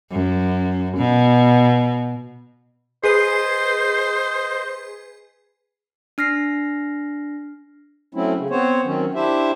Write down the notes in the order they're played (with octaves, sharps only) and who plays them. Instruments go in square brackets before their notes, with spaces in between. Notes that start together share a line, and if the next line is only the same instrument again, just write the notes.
[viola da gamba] F#2
B2
[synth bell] G#4 B4 C7 [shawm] C5 [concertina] D#5
[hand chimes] D4 F6 A#6 C7
[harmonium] F#3 A3 C4 C#4 E4
C#3
B3 C4 C5 C#5
D#3 F#3 C4 C#4
D4 E4 G4 C5 E5